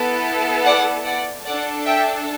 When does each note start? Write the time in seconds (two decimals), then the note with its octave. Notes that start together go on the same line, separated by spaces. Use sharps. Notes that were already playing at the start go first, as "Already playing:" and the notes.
Already playing: B3 E4 A4
0.64 D5 F#5
1.05 D5 F#5
1.46 D4 A4 D5 F#5
1.85 E5 G5